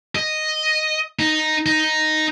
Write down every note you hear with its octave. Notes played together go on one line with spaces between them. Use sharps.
D#5
D#4
D#4